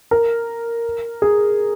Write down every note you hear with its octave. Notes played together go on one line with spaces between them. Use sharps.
A#4
G#4